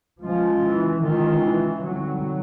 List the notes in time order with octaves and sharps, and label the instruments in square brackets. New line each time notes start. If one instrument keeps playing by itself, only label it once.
[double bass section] F3 [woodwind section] G#3 C#4 F4
[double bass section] E3
[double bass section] D#3 [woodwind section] G#3 C#4 F4
[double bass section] E3
[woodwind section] D3 G3 C4 D#4 [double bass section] F#3